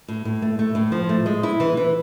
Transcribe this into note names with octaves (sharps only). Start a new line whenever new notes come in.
A2
A2
A3
A3
A2
F3
A3
G#3
E4
E3
E3